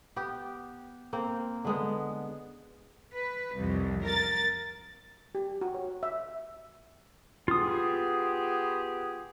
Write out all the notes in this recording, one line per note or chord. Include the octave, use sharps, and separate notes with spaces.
B3 G4
A#3 C4
D3 G#3 B3
B4
C2 F2
A#4 A6
G4
F#4
C#5
E5
B3 F4 G4 G#4 D#6